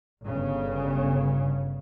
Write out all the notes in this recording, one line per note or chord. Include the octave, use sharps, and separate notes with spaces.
G1 C#3